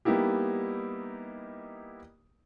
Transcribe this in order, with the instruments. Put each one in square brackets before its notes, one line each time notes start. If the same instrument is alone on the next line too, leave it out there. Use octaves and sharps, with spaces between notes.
[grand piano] G3 A#3 B3 D#4 E4 G4